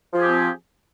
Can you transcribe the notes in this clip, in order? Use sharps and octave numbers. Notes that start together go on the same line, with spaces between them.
F3 C4 G4 G#4